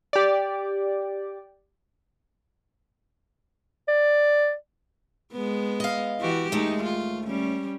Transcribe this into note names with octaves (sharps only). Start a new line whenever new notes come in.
G4 D5
D5
G#3 B3
D#5 F5
E3 F#4 G4
D#2 G#3 A3 D#4
F4
G3 C#4